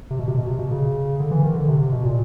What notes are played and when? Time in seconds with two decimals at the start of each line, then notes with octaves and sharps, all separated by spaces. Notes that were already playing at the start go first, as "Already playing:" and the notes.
0.10 C3
0.19 B2
0.28 C3
0.38 B2
0.47 C3
0.59 B2
0.71 C#3
1.20 D3
1.31 E3
1.43 D#3
1.55 D3
1.68 C3
1.80 C3
1.92 B2
2.05 A#2